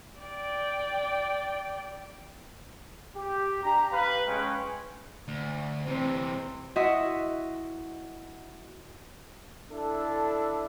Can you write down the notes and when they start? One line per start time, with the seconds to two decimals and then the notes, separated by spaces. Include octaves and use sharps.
0.20 D5 G5
3.17 G4
3.64 D4 G4 A#5
3.92 B4 F5
4.27 G#3 C#4 B4 G5
5.28 D2
5.87 C3 E3 C4
6.76 E4 F#4 D#5 E5 F#5 C6
9.71 D4 E4 A4